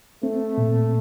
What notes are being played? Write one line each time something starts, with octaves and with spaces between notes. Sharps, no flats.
A3 C4
A#2